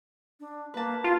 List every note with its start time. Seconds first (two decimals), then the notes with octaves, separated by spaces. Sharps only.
0.40 D4
0.74 A#3 B4 A5
1.04 F4 F5